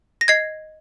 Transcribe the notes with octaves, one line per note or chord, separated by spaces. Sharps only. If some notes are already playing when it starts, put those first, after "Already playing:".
A#6
D#5 G#6 C7